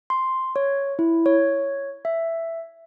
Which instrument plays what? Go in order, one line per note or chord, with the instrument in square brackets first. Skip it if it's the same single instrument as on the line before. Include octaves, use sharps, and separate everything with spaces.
[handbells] C6
C#5
E4
C#5
E5